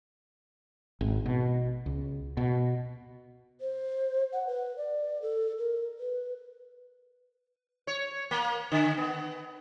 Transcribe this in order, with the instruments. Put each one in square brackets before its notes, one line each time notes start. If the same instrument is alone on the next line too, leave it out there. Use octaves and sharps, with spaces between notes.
[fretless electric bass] G#1
B2
C#2
B2
[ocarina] C5
F#5
B4
D5
A4
A#4
B4
[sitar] C#5
A#3
D3
B3